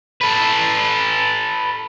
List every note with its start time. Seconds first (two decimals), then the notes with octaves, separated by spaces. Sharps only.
0.21 A4 B4